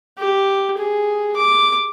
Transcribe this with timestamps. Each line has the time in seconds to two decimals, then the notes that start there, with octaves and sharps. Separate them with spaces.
0.18 G4
0.77 G#4
1.36 D6